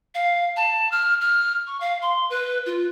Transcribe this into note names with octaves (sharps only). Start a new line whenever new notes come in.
F5
A5
F6
F6
C#6
F5
C6
B4
F4